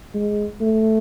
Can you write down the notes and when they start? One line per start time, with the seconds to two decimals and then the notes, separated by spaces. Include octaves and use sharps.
0.14 G#3
0.61 A3